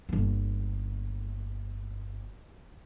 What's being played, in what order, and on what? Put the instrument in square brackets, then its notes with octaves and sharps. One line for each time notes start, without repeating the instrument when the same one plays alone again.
[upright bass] G1 A#3